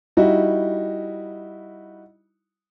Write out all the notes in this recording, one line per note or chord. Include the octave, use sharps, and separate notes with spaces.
G3 D#4 E4 F#4